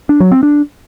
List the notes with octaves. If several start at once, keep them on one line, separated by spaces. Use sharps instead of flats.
D4
F#3
C4
D4